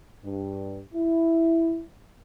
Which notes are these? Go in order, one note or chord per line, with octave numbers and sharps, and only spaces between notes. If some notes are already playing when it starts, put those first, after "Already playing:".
G2
E4